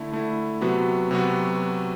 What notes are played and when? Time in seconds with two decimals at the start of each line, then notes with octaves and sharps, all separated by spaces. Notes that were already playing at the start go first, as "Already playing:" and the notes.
Already playing: D3 A3 E4
0.12 D3 A3 E4
0.61 C3 F#3 B3 F#4
1.11 C3 F#3 B3 F#4